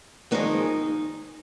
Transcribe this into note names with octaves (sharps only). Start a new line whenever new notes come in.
F2 D#3 G#3 B3 D#4